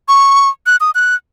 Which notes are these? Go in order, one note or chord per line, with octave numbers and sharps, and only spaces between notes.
C#6
F#6
D#6
F#6